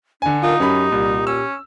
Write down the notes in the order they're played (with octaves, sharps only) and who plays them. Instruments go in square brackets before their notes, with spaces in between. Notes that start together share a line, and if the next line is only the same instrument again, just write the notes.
[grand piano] D3 G#5 [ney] D4
[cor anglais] D#4 [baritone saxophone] F4 [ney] A#4
[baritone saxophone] F#2 [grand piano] C#4 B5 [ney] G4
[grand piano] C2 [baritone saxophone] A#2
[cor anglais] C#4 [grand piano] E6